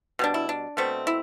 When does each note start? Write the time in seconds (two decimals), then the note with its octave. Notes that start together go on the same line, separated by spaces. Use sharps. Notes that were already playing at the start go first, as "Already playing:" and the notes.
0.19 B2 G3 D4
0.34 E4
0.49 D4
0.77 B2 A3 C4
1.07 E4